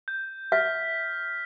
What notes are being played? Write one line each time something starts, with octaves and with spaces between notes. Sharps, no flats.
G6
E5 F6 B6